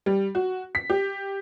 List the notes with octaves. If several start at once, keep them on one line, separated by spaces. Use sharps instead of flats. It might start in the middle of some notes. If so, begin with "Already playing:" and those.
G3
F#4
B6
G4